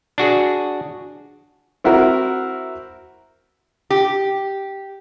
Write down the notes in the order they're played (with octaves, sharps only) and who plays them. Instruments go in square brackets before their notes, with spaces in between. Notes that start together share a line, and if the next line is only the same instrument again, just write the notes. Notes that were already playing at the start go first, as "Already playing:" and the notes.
[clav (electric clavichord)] D4 F#4 G#4
[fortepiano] C4 E4 F#4 A#4
[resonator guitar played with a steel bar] G4